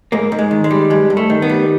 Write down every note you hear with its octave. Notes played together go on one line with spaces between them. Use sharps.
G#2 A#3
G#2
G#3
D#3
G#3
G3
G2 G#3
G2
A3
D#3
B3
G3